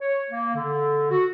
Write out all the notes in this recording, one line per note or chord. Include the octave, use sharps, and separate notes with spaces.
C#5
A#3
D3
F#4